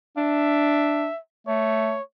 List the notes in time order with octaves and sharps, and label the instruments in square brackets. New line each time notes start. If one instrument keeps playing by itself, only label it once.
[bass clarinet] D4 [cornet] E5
[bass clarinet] A3 [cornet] C#5